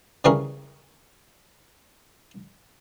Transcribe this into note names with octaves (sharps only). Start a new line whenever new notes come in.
C#3 E3 G3 C#4 G#4 A#4